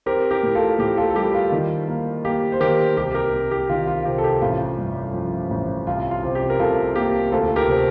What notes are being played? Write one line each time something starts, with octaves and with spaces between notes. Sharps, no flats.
C4 G4 A#4
G4 A#4
A2
F4 A4
A2 G4
F4 A4
A4
G3 G4
F4
D#3
A#3
A#3 G4
C5
D#3 G4 A#4
C2 G4
G4 A#4
C2
G4
D#3 F4
F4
C3 G4
A4
G4
A1 F4
G2
F3
A1
C2 F4
F4
C3
G4
A#4
C2 F4 A4
A#3 G4
D2 F4 A4
G4 A#4
C3